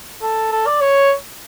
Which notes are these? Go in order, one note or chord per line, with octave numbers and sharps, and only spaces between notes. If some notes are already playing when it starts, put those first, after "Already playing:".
A4
A4
D5
C#5